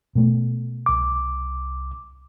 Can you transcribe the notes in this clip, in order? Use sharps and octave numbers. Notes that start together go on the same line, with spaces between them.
B2 A3
C2 D6